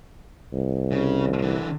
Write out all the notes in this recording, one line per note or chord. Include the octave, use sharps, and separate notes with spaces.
C2
C#3
D3 E3